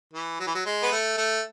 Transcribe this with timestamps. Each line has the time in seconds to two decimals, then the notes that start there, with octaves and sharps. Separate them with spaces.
0.13 E3
0.40 F#3
0.47 E3
0.55 F#3
0.65 G#3
0.83 B3
0.91 A3
1.17 A3